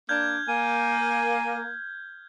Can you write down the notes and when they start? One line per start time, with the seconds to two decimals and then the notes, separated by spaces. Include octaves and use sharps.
0.09 A#3 D4 F6 G6 G#6
0.48 A#3 G#5